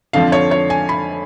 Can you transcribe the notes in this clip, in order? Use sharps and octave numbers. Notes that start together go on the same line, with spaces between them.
F2 D3 F3 F5
C#5
C#5
G#5
B5